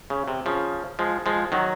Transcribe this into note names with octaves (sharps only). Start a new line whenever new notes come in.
C#3
C3
C#3 F3
F3 G#3
F3 G#3
D#3 F#3